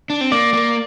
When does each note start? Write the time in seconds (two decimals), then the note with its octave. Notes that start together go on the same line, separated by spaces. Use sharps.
0.10 D4
0.21 C4
0.32 A#3 D5
0.54 A#3